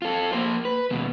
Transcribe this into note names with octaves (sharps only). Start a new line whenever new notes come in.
F4 A4
A#3 C5
B4
D#2 B2